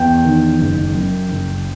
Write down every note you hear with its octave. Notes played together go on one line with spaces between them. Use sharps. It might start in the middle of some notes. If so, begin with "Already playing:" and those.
Already playing: E2 G5
D#3
F#1
F#2
F#1